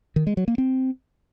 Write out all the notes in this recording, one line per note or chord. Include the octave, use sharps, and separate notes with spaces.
D#3
G#3
F#3
A#3
C4